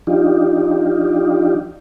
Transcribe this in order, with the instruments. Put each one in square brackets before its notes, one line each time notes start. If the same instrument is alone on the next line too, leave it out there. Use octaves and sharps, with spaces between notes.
[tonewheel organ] F3 D4 D#4 F4 G4